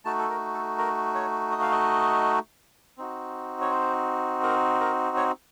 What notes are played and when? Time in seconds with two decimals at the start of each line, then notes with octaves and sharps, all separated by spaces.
0.05 A3 D#4 F#4 A5
0.19 A4
0.30 A#4
0.54 A4
0.78 A#4
1.15 C#5
1.52 D#5
1.62 F5
1.72 D#5
2.98 C4 D#4 F#4
3.61 C#5
3.71 C5
4.44 A#4
4.81 A#4
5.17 C#5